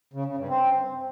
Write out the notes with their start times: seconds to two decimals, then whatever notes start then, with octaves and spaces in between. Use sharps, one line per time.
0.13 C#3
0.25 C#3
0.37 G2
0.49 C4